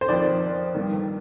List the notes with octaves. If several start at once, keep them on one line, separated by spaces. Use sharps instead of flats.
C5
F2 D#3 D5
G2 D#3